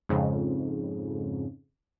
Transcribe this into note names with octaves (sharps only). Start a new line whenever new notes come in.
F2 G#2 C#3